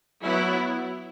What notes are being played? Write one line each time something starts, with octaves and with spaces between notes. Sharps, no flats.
F#3 B3 E4